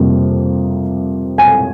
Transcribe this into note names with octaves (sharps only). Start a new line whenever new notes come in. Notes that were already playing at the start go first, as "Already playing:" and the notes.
Already playing: F2 C3 G3 A#3
G#5